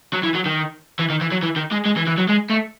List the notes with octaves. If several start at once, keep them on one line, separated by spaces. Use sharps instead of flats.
F#3
E3
F#3
D#3
E3
D#3
E3
F#3
E3
D#3
G#3
G#3
E3
E3
F#3
G#3
A3